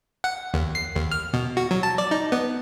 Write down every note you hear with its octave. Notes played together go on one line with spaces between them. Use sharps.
F#5
D#2
C7
D#2
F6
B2
F#4
F#3
A5
D5
D#4
B3